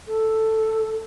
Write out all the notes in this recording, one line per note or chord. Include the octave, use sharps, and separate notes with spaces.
A4